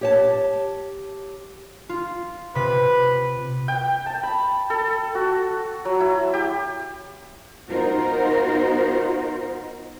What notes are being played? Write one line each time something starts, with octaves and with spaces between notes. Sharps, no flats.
G4 C#5 A5
F4
C3 B4 B6
G5
A5
B5
A4
F#4
F#3
E4
G4
B3 D#4 F4 F#4 A#4 C5